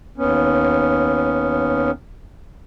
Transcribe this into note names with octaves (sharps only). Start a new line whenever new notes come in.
D#2 B3 C#4